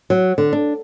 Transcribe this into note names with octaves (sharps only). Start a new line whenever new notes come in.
F#3
D3
D4